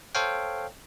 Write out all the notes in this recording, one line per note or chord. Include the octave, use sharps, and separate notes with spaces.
A4 C5 C#5 F5 G5